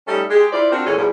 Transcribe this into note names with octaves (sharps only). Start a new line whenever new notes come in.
G3 A3 C#4 D#4 A4
G#3 G4
E4 F4 C5 D5
C4 D4 F4 F#4 A#4 C5
A#2 E3 G#3 C#4 A4
G#2 B2 F3 G3 E4